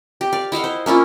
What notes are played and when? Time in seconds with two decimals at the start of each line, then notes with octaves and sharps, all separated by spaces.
0.21 G4
0.33 D5 F5
0.52 E4 D#5 F5 F#5
0.64 C5
0.86 A#3 C#4 E4 F4